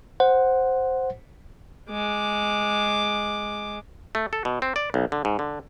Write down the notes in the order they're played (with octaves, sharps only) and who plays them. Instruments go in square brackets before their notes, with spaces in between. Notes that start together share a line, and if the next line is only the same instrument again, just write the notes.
[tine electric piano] C5 F#5
[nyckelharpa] G#3 D6
[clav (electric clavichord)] A3
A4
B2
C4
D5
B1
D3
G#2
D3